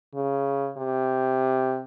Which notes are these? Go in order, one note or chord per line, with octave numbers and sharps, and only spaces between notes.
C#3
C3